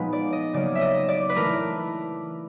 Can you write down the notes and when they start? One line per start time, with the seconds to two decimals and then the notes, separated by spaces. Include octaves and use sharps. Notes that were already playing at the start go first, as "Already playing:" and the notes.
Already playing: A#2 F3 G#3 B3 D#4 B4
0.13 D5
0.33 D#5
0.53 C#3 F#3 A#3 C#4 D5
0.75 E5
0.81 D#5
1.09 D5
1.29 B4
1.36 E3 A3 A#4